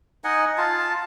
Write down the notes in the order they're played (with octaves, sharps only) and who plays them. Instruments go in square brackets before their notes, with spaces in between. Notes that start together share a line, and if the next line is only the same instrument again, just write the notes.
[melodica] D#4 D#5 F#5 G#5
F4 A5